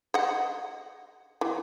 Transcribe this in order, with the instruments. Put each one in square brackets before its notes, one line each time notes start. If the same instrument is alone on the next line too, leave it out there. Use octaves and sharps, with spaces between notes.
[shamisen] D#5 F#5
E3